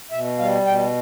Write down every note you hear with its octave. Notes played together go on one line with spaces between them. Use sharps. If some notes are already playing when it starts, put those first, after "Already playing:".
B2 E5
G3 F5
B2 G5